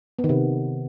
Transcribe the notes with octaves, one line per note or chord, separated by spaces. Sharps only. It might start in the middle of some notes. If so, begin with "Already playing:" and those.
B3
D#3
C3